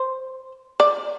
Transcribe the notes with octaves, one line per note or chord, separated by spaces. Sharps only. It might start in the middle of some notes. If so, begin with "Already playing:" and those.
Already playing: C5
D5